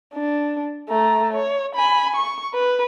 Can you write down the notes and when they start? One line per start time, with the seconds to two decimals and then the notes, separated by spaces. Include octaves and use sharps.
0.14 D4
0.89 A3 A#5
1.33 C#5
1.76 G#5 B5
2.16 C#6
2.54 B4